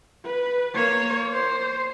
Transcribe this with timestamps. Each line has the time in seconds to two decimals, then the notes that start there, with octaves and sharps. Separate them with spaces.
0.25 B4
0.74 A#3 C#5
1.33 C5